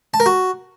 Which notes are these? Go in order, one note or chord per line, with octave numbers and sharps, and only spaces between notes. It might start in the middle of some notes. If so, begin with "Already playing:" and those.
A5
A#4
F#4